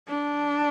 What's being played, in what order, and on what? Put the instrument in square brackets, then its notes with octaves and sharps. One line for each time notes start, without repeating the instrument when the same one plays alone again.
[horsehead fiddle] D4